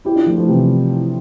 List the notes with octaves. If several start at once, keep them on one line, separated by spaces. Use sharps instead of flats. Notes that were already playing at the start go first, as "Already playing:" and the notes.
E4 G4
D4 F4
F3 A3
F3 A3
C3 E3